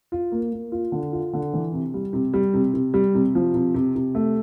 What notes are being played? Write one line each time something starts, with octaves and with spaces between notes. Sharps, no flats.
F4
A#3
A#3
F4
D3
F4
D3
E3
C3
G3
C3
G3
C3
C3
G3
C3
F3
C3
C3
C3
A3